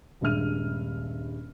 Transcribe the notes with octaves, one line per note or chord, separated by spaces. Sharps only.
D#1 G2 G#3 E5 F6 D#7